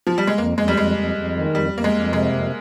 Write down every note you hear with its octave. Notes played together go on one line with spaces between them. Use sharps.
F3
G3
G#3
F2 A#3
F2 G#3
G3
F2 G#3
F2
F2
D#3
F2 G3
F2 A#3
G#3
F2
C3 G#3
F2